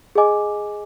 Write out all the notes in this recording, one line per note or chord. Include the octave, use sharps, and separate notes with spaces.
G#4 D#5 G#5 D6